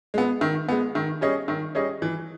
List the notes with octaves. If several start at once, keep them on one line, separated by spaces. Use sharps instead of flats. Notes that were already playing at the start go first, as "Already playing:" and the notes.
G#3 B3
D#3
G#3 B3
D#3
G3 C#4 G#4 D#5
D#3
G3 C#4 G#4 D#5
E3